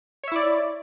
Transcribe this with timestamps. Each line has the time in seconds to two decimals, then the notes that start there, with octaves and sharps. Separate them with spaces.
0.24 C#5
0.28 E5
0.32 E4
0.36 D5